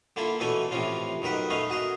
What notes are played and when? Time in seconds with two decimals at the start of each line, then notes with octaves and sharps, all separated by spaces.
0.16 D3 A#3 E4 F4 A4
0.40 B2 E3 A3 C#4 A4 G#5
0.71 A2 C3 E3 F3 C#4 F4
1.22 B1 D#3 A#4 B4 F#5
1.50 A3 C#4 C#5 D#5 F5
1.70 F#4 G#4 A#4 D#5